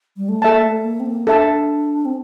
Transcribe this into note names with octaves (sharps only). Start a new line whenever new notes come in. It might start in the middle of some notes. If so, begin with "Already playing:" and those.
G3
A3
A#3 A4 E5 A5
A3
A#3
C4
A#3
D4 A4 E5 A5
C4